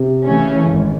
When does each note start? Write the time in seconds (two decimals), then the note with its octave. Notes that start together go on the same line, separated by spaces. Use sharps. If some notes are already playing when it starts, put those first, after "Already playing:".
Already playing: C3
0.25 C#3 E3 A3 C#4
0.69 G#1